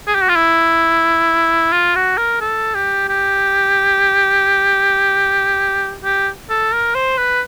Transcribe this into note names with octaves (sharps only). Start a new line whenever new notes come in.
G#4
G4
F#4
F4
E4
F4
F#4
A#4
A4
G4
G4
G4
A4
A#4
C5
B4